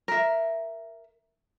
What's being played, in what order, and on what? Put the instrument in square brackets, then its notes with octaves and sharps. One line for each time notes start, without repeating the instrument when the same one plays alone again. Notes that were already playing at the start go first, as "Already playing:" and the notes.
[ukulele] A#4 E5